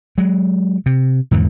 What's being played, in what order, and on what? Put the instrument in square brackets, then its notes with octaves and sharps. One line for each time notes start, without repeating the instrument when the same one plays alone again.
[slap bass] F#3 G#3
C3
E2 G#2 D3 D#3